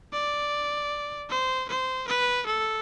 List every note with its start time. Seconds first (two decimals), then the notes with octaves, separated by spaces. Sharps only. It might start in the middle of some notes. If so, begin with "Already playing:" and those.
0.13 D5
1.30 C5
1.69 C5
2.07 B4
2.46 A4